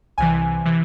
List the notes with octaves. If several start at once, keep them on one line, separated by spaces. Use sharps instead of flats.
C2 C3 E3 G#5
C3 E3